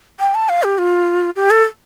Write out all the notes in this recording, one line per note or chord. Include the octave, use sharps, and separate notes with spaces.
G5
A5
F5
G4
F4
G4
A4